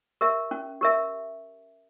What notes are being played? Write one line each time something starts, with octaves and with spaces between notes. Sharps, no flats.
G4 A#4 E5
C#4
G4 A#4 E5